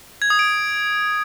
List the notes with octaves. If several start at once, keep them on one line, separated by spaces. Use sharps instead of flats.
G#6
D#6
D7